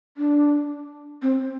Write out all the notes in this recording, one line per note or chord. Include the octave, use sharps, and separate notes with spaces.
D4
C4